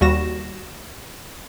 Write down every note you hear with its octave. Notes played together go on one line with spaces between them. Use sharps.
D#2 G3 F#4 A#6 E7